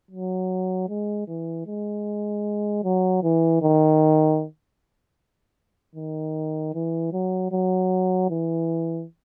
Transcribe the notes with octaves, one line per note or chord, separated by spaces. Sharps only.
F#3
G#3
E3
G#3
F#3
E3
D#3
D#3
E3
F#3
F#3
E3